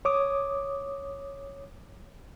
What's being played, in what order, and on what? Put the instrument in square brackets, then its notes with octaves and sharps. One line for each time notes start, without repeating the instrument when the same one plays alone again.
[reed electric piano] C#5 D6 D#6